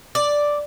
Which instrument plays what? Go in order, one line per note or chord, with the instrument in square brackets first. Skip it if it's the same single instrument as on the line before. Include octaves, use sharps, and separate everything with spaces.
[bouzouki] D5